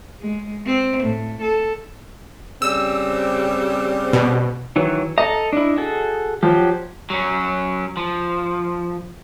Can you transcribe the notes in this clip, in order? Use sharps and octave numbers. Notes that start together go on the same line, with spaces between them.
G#3
C4
A2
A4
C#3 G3 C4 E6
B2
D#3 E3 F#3
A4 D#5 A#5
D4 E4
F#4 G#4 A4
F3 F#3 G4
F#3 C#4
F3